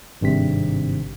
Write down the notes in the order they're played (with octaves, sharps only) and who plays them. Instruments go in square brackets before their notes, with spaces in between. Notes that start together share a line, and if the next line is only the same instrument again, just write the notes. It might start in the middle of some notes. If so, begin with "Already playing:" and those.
[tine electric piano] G#1 G2 C3 B6